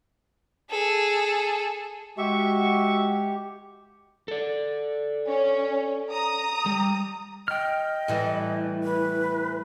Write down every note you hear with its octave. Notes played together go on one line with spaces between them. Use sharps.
G#4 A4
G#3 F#4 G4 E5 C#6
A4 D5
C#4
A#5 D#6
G3
D#5 G5 F6
A2 E3 G3
B4